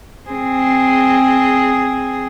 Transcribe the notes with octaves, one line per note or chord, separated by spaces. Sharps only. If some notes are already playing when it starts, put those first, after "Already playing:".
C4 G#4